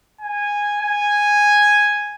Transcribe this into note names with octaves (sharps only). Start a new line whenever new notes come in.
G#5
G#5